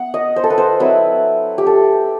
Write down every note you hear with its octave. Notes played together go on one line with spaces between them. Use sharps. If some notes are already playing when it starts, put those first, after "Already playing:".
Already playing: B3 F#5
D#5
C5
A4
B4
C5
F#3 C4 E4 B4
G4
A4